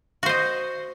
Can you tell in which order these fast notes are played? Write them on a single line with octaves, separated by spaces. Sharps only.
F#4 C5 D#5